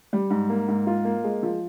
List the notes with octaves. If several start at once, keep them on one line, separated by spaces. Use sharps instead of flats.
G3
G#2
A#3
G#2
F4
A#3
G#3
F3